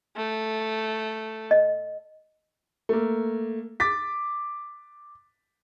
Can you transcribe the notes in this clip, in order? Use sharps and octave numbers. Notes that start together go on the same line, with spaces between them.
A3
D#5
A3 A#3
D6 A6 B6